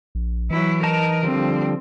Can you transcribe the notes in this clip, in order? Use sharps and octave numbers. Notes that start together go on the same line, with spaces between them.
A#1
E3 F#3 E4
D#4 A#4 A5 A#5
D3 F3 G3 C4